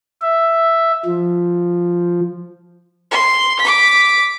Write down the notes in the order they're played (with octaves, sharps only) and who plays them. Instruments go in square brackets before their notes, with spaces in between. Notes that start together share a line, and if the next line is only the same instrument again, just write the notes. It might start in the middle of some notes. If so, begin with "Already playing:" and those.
[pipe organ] E5
F3
[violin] C6
D6 B6